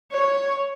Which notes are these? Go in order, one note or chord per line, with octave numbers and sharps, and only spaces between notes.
C#5